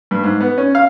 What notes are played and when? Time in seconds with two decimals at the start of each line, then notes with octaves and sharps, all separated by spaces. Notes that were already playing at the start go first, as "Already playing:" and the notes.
0.11 G2
0.23 G#2
0.40 B3
0.58 C#4
0.75 F5